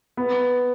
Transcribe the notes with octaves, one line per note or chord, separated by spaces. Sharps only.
B3